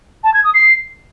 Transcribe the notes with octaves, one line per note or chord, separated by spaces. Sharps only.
A5
G#6
D#6
C7